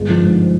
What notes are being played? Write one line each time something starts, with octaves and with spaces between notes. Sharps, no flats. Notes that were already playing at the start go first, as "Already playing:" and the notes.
Already playing: G1 G#3
F3
G#2